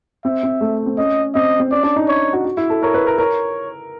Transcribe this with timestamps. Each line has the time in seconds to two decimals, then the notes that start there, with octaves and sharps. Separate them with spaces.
0.24 C4 E5
0.43 C4
0.61 A3
0.86 C4
0.98 C#4 D#5
1.34 C4 D#5
1.60 C4
1.71 C#4 D5
1.83 D4
1.96 D#4
2.08 C#5
2.33 F#4
2.45 F#4
2.57 E4
2.70 A4
2.83 A#4 C#5
2.94 B4
3.07 A#4
3.18 A#4 C#5